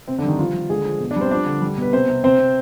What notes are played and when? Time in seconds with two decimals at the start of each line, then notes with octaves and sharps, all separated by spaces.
0.08 C3 C4
0.18 D3 D4
0.23 G3
0.28 D#3 D#4
0.39 F3 G3 F4
0.55 G3
0.70 D3 G#3 G#4
0.85 F3
1.00 B2
1.11 D4 D5
1.16 G3 C4 C5
1.31 F3 D4 D5
1.46 D3
1.62 G3
1.78 B2 B4
1.93 C3 C4 C5
2.09 C3
2.24 C3 C4 C5
2.39 C3